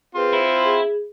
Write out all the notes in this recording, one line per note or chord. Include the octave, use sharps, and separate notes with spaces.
C4 F4 G#4 B4
E4 C5
G#4